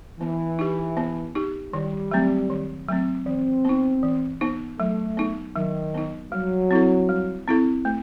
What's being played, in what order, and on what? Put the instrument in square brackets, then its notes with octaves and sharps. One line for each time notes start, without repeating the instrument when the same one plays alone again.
[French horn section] E3 [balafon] B3
[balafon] D#4 G4
B3
D#4 G4
[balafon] D#3 [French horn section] G3
[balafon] F#3 A3 C4
D#3
F#3 A3 C4
[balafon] E3 [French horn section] C4
[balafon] B3 D#4
E3
B3 D#4
[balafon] F#3 [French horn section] A3
[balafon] B3 D#4
[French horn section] D#3 [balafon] F#3
[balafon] B3 D#4
[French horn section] F#3 [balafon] G3
[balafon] C4 E4 A4
G3
C4 E4 A4
A3